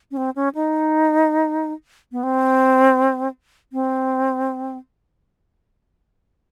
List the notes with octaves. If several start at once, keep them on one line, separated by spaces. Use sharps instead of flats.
C#4
C4
C#4
D#4
B3
C4
C4